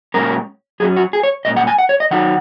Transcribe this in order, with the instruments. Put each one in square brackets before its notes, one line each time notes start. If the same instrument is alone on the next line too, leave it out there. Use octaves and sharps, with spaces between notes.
[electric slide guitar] A#2 G#3 C#4 A#4
F#2 F#3 C#4 G#4
F#4
G#4
C#5
A#2 G#3 C#4 D#5
F#5
G#5
F#5
C#5
D#5
D#3 F#3 D#4 F#5